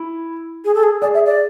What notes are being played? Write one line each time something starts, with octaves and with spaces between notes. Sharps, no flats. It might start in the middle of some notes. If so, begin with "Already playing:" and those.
Already playing: E4
G#4
A4
G#4
G#4 D5
E5
D5